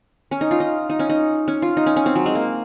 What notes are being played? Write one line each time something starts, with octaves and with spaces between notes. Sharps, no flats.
C#4
D#4
F4
D#4
D#4
C#4
D#4
C#4
F4
D#4
C#4
C#4
C4
F#3
G#3
A#3